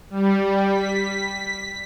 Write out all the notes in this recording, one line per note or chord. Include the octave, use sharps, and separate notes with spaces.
G3
B6